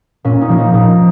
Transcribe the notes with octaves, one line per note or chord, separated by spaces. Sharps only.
A#2 C#4
D#4
F3 A#3
D#4
A#2 D#4